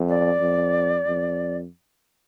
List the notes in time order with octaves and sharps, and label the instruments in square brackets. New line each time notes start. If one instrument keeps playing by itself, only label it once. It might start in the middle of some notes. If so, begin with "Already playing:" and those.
Already playing: [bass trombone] F2
[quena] D5
[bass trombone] F2
F2